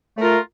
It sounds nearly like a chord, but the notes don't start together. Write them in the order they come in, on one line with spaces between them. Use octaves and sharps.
A3 A#4 F4